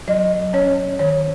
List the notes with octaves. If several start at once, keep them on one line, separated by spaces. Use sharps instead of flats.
F#3 D#5
C#4 C#5
D#3 C#5